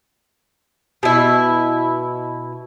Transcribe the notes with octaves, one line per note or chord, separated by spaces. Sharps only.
B2 E4